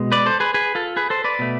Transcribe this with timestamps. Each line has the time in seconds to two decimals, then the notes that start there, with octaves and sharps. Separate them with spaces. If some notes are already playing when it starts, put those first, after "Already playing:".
Already playing: B2 G#3
0.12 B4 D5
0.26 A4 C5
0.40 G#4 B4
0.54 G#4 B4
0.75 F4 A4
0.96 G#4 B4
1.10 A4 C5
1.24 B4 D5
1.39 B2 A3